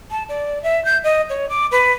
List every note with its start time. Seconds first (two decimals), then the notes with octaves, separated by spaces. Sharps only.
0.11 A5
0.29 D5
0.63 E5
0.85 G6
1.04 D#5
1.29 C#5
1.49 D6
1.71 B4